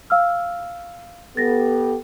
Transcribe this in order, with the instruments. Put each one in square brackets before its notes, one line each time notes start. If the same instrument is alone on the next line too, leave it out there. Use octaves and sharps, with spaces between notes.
[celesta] F5 E6 F6
[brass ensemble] B3 G4 A4 [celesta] A6 A#6